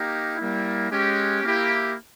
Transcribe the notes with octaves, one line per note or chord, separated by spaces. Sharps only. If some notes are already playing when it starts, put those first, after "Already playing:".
Already playing: A#3 D#4 G4
G3 A#3 E4
G#3 C#4 G4
A#3 E4 G4